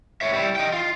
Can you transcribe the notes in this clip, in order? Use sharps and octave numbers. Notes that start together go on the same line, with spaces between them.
C#5 E5
G3 E4
D#5 G5
F4